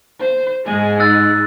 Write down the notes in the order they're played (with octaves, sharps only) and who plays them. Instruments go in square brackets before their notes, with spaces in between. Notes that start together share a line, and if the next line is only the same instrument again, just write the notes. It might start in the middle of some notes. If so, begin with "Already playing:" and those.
[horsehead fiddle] C5
[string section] G#2 G#3 [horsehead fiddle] G#5
[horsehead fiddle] D#4 [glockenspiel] E6 F#6 A6